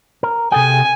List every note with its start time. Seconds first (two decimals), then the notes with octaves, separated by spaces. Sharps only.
0.23 A#4
0.52 C3 G#4 A4 G5 G#5